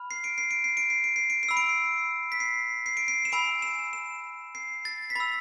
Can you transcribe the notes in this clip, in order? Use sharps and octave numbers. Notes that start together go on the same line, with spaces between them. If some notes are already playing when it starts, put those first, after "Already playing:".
Already playing: B5 F6
C7
D7
C7
D7
C7
D7
C7
D7
C7
D7
C7
B5 E6
D7
C7
B6
C7
C7
D7
C7
E7
G#5 B5 E6 D7
E7
E7
C7
A6
B6
B5 E6 A6